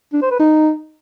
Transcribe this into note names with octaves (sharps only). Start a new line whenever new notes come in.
D4
C5
B4
D#4